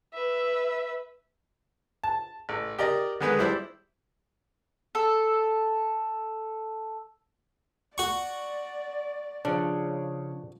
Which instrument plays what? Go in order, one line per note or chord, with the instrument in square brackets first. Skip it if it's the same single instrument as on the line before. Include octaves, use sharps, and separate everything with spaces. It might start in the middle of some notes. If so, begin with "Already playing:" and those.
[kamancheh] B4 E5
[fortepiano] A5
A1
G4 A#4 D5 D#5
D3 D#3 G#3 B3 G#4 B4
G3 E4 C5 D5
[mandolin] A4 E6
[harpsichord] F#4 C#6 [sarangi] D5
[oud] C#3 [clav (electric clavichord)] F3 D4